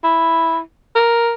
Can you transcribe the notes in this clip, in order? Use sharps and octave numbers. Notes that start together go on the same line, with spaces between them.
E4
A#4